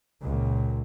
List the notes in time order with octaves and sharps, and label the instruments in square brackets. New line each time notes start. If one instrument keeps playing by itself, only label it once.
[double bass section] C#2 A#2